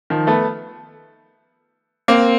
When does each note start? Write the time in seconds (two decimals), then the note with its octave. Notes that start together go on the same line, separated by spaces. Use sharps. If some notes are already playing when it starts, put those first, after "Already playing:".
0.10 D#3 F3
0.27 A3 B3
2.08 A#3 C4